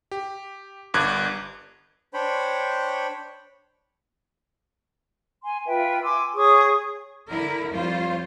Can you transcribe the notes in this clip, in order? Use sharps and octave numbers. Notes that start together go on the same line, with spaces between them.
G4
G1 G2 D6 F#6 G#6
D4 C5 C#5 G5 B5
G#5 C6
F4 B4 E5 G5
G#5 C6 D6 E6
G#4 C#5 C#6 D#6
D3 E4 A#4
F2 G3 F4 C5 C#5